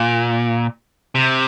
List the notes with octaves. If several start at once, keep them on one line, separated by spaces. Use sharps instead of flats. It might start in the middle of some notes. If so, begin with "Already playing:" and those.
Already playing: A#2
C3